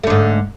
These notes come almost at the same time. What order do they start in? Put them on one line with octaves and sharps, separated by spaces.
A3 D3 G#2